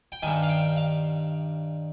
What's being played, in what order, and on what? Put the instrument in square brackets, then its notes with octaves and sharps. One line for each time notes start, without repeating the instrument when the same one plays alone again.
[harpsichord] G5
D#3 G#5
G2
F5
G5
F5